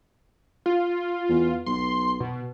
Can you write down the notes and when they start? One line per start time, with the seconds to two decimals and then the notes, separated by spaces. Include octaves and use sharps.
0.66 F4
1.29 E2
1.66 B1 C6
2.20 B2